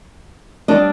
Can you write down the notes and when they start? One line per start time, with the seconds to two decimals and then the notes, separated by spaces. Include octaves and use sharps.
0.68 D#3 G3 D4 D#5